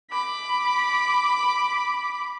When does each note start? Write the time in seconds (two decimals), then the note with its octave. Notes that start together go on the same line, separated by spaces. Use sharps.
0.10 B5 D6